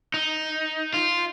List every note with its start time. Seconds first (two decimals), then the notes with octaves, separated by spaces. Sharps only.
0.14 D#4
0.94 F4